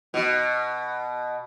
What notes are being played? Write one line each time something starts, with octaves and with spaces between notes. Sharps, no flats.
B2